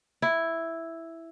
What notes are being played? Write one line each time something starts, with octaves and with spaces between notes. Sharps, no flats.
E4